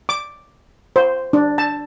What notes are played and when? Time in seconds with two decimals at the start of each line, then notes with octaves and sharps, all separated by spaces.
0.09 D6
0.96 C5
1.33 D4
1.58 A5